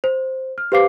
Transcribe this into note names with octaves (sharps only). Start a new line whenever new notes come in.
C5
F6
G4 B4 C5 F5 D6 C7